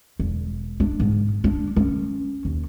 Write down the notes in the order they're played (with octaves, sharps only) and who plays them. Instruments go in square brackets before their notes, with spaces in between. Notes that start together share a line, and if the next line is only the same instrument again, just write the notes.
[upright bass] E1
D4
G#2
D4
C#4
D#2